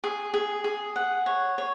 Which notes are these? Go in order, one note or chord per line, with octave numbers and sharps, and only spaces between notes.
G#4
G#4
G#4
F#5
C#5
C#5